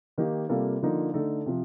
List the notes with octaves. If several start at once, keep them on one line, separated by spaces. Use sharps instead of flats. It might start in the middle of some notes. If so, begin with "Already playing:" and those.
D#3 A#3 D#4 G4
C3 G3 A#3 F4 A4
D3 F3 A#3 D#4
D3 A3 D#4 A4
C3 F3